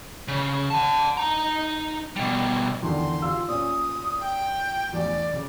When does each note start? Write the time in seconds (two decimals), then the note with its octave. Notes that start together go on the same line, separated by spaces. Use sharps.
0.28 C#3
0.70 F#5 A5
1.17 D#4 A#5
2.16 B2 G3
2.83 E2 D3 D#3 C6
3.22 F4 G4 E6
3.48 A#2 C#4 D#6
4.21 G5
4.93 A1 E2 D5
5.33 C#3